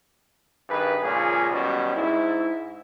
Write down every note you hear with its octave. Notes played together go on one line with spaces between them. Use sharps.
G2 D#3 G#4 B4
C#2 A#2 F3 C#4 G#4
F#2 B2 D#3 G3 C#4
G#2 E4